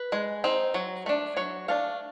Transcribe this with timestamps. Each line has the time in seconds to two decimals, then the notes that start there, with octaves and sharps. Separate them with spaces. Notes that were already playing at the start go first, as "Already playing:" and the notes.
Already playing: B4
0.12 G#3
0.44 C4 D#4
0.74 F#3
1.06 A3 D4
1.37 F#3 C#5
1.68 A3 D4 F5